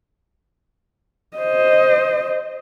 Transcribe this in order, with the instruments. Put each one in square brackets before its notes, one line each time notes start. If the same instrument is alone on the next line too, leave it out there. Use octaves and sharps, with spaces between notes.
[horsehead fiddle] C5 D#5